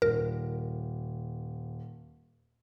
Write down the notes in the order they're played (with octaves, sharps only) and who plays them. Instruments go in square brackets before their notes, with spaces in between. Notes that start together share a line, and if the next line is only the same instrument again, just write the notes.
[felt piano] D#1 [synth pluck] A#4